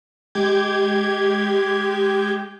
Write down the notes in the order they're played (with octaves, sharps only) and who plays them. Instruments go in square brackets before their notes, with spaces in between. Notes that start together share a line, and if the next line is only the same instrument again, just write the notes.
[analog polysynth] G#3 G4 D6 G6 G#6